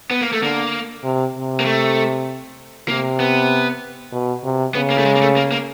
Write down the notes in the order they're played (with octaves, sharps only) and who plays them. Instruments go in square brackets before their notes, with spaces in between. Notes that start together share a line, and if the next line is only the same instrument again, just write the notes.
[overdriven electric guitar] B3
A#3
A3
[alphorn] D3 [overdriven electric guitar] A#3
[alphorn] C3
C3
[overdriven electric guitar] A#3
A3
[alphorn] C3 [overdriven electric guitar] A#3
[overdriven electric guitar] B3
[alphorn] B2
C3
[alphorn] C#3 [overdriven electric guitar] B3
[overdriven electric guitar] A#3
A3
G#3
A#3
A3
A#3
A#3